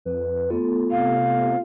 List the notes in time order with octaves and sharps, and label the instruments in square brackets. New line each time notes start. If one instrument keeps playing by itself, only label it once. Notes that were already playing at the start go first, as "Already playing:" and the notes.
[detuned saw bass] F2 [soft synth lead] B4
[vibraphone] A3 B3 A4 [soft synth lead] F4
[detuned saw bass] C3 [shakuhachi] F5